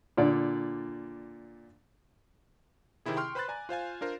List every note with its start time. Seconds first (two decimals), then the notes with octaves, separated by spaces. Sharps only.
0.17 A#2 D3 D5
3.06 C3 D#3 C4 E4 G#4
3.17 G5 C6 C#6 F6
3.35 B4 C5 B5 C6 F#6 A6
3.48 D5 G#5 A#5
3.69 F4 C5 F5 G#5
4.01 D4 F4 A#4 C5